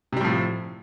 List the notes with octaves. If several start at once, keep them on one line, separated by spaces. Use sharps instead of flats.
A2 C3 F3 G3